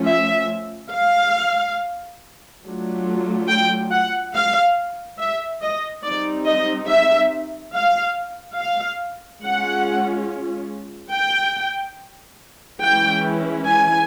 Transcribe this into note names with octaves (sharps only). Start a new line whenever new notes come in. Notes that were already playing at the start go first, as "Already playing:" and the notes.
Already playing: F3 A3 C#4 F4
E5
F5
F#3 A3 D4 F4
G5
F#5
F5
E5
D#5
G3 C4 D#4 D5
D#5
E5
F5
F5
G#3 C#4 F4 F#5
G5
E3 G#3 C#4 E4 G5
G#5